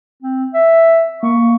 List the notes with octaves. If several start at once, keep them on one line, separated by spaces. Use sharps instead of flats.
C4
E5
A#3 C#6